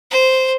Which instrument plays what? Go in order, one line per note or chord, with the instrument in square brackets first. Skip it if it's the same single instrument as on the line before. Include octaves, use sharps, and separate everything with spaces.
[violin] C5